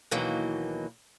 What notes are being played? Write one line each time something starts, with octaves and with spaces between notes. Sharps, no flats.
D#2 B2 E3 F#3 A#3 D#4